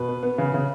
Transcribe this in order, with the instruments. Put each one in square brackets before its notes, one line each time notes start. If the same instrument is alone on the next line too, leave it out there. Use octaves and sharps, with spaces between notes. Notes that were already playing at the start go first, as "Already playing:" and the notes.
Already playing: [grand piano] B2 B4
B3
B3
C#3
C#3